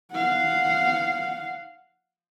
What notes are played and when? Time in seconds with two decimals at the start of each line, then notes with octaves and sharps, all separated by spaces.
0.12 F5 F#5